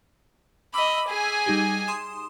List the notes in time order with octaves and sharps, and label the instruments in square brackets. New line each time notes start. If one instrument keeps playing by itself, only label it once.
[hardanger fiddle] D#5 B5 [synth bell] D6 E6 B6
[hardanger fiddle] G#4 G#5
[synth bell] G3 D#4 G4
C6 D#6 E7